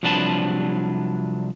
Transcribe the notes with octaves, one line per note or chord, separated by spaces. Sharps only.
C2 F3 F#3 D4 B4 A5